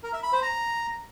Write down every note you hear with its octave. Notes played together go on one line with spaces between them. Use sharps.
A#4
E5
B5
C5
A#5